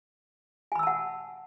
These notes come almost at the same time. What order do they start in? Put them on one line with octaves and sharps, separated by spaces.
G#5 B5 E6 A5 F#5